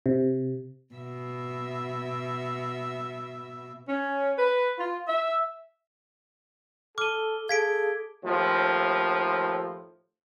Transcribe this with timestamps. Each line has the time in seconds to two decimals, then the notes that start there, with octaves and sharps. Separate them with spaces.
0.06 C3
0.94 B2 E5
3.89 C#4
4.39 B4
4.79 F4
5.08 E5
6.98 A4 D6 F6 D#7 G7
7.49 G#4 A4 F5 G#6 B6 D7
8.23 D#2 A2 F3